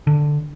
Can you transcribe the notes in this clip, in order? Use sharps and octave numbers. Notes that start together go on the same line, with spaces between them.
D3